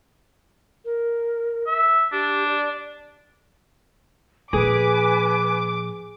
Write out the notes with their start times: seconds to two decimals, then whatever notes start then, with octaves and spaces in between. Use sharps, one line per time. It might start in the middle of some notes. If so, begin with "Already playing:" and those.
0.85 A#4
1.67 E5
2.12 D4 G4
2.48 D5
4.53 A#2 F3 G#4 B4 G#5 D6